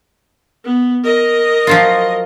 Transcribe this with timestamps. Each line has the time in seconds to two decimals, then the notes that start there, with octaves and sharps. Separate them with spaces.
0.64 B3
1.04 A#4 D#5
1.67 F3 F#3 F4